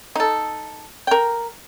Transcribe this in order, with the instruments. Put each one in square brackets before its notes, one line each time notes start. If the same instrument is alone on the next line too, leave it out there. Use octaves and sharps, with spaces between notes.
[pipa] D#4 A4
A#4 G5